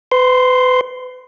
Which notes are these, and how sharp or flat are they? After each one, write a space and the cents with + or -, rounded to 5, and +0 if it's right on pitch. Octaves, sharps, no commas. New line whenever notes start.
B4 +35 C6 +0